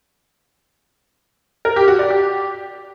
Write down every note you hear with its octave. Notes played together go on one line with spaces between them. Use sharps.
A#4
G4
F#4
D5
G4